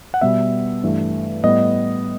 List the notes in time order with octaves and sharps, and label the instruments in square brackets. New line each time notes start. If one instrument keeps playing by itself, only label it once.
[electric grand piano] F#5
B2 G3 B3 E5
G2 E3 A3
A2 G3 B3 D#5